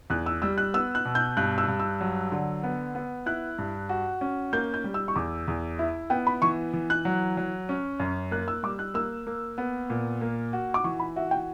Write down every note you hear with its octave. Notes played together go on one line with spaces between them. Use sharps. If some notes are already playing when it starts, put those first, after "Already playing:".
E2 F#6
E6
G3 E6
F#6
B3 E6
F#6
B2
G6
G2 F#6
E6
G2
E6
F#3
D3
B3
B3
E4 F#6
G2
F#4
C#4
A#3 G6
G6
G3
E6
C#6
E2 D6
E2
E4 E5
B3 G5
B5
E3 C#6
E3
F#6
F#3
F#3
C#4
F#2
A#3 F#6
E6
G3 D6
F#6
A#3 E6
A#3
B3
A#2
A#3
F#4
D6
E3 C#6
B5
F#4 E5
G5